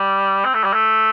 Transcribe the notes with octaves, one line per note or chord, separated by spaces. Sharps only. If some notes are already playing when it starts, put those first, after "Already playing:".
Already playing: G3
C4
A3
G3
A3